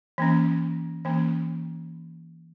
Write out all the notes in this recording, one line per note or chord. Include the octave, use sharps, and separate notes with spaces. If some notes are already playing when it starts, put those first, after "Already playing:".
E3 A#3 C#4
E3 A#3 C#4